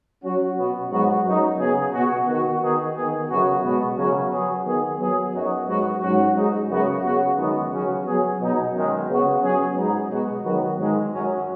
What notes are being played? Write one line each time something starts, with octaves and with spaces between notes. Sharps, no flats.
F#3 C#4 F#4
B2 B3 F#4
G#2 F#3 B3 F#4
F#2 F#3 D#4
C#3 B3 G#4
B2 B3 F#4
D#3 B3 F#4
D#3 B3 D#4 G#4
D#3 B3 G#4
F#2 C#3 B3 F#4
B2 G#3 B3 F#4
F#2 C#3 F#3 C#4 F#4
F#3 B3 G#4
D#3 B3 G#4
F#3 B3 G#4
F#2 F#3 D#4 F#4
G#2 F#3 B3 F#4
G#2 F#3 C#4 F#4
G#2 G#3 D#4
F#2 C#3 B3 F#4
C#3 B3 F#4
F#2 D#3 G#3 B3
C#3 F#3 C#4 F#4
F#3 B3 G#4
B2 F#3 D#4
F#2 D#3 G#3
C#3 B3 F#4
F#3 C#4 G#4
G#2 F#3 B3 D#4
B2 G#3 B3 F#4
D#3 F#3 B3 F#4
G#2 D#3 G#3
F#2 F#3 C#4